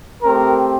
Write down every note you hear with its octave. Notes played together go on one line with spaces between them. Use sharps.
A3 C4 G4 A#4